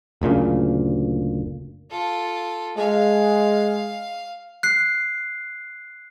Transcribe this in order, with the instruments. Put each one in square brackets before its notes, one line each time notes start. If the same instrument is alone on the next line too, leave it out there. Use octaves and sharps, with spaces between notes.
[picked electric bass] F#1 D2 A#2 C#3
[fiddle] F4 A4
[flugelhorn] G#3 [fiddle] F5
[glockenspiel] F#6 C7